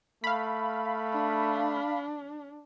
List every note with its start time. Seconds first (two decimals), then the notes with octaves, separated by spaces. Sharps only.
0.24 A3 F5 B5
1.13 D4